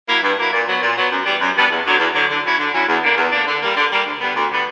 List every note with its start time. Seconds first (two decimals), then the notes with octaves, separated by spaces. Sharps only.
0.09 F#3 A#3 E4
0.23 G2
0.38 F#3 A#3 E4
0.53 A#2
0.67 F#3 B3
0.82 A#2
0.97 F#3 B3
1.11 F#2
1.26 E3 G3 B3 D4
1.40 F#2
1.55 E3 G3 B3 D4
1.71 E2
1.86 D3 F#3
1.99 E2
2.14 D3 F#3
2.30 D3
2.43 F#3 C#4 E4
2.59 D3
2.74 F#3 C#4 E4
2.88 E2
3.03 D3 A#3 D4
3.17 E2
3.32 D3 A#3 D4
3.47 D3
3.62 G3 A#3
3.76 D3
3.91 G3 A#3
4.05 D2
4.20 D3 G3 B3
4.36 D2
4.50 D3 G3 B3